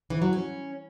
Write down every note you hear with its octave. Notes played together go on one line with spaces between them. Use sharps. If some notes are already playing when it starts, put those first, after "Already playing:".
E3
F#3
C#4